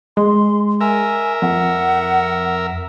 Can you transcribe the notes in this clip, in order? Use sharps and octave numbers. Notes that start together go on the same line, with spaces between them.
G#3 C6
A#4 E5 G#5
F2 F#5